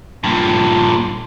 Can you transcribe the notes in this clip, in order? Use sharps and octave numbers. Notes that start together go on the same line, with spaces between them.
G2 A#2